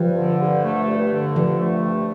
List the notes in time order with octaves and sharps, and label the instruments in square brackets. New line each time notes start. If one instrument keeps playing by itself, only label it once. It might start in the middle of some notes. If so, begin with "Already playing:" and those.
Already playing: [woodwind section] G2 [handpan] F3
[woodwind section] D3
G2
A3
G2
D3
[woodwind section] G2 [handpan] F3
[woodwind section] A3
G2